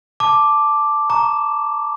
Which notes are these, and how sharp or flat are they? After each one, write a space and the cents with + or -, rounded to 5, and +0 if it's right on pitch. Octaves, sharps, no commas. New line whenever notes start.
A5 -5 D6 +0
A#5 +0 C#6 +40